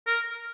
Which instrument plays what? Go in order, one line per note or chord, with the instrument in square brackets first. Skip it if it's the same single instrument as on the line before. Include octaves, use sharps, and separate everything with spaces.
[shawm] A#4